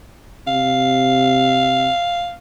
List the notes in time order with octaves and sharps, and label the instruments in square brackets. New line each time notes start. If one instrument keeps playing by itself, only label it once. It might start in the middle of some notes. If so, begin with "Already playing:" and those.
[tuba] C3 [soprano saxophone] F5